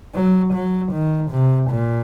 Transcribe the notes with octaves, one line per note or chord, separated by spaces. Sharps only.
F#3
F#3
D#3
C3
A#2